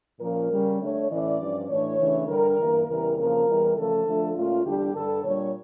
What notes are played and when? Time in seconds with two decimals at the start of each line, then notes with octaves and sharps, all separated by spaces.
0.20 A#2 F3 C#4 A#4
0.50 C#3 G3 C#4
0.79 D3 A3 D4 C#5
1.09 A2 E3 A3 C#4 D5
1.39 G2 F3 C#4
1.69 A2 E3 A3 D4 C#5
1.98 C#3 E3 A3 D4
2.28 G2 D3 G3 A#4
2.58 G2 E3 A#3
2.87 E2 C#3 E3 G3 A#4
3.17 F2 C#3 F3 A#3 A#4
3.47 E2 E3 G3
3.75 C#3 F3 A3 A4
4.06 D3 F3 A3 D4
4.35 A#2 A3 C#4 F4
4.65 E2 D3 G3 D4 G4
4.94 G2 D3 G3 A4
5.24 A#2 G3 D4 C#5